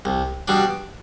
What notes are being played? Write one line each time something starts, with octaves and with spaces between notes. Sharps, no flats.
C2
B2 G3 D4